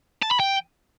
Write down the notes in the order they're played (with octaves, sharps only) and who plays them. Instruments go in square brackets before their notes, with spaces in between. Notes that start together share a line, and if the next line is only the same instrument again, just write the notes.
[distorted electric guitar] A5
B5
G5